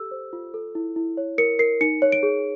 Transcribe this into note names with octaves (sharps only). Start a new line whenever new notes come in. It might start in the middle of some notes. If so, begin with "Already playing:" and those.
Already playing: G4 A4 E6
C5
F4
A4
E4
E4
C#5
A#4 C#7
A#4 C7
D#4 C#7
C#5
D7
G#4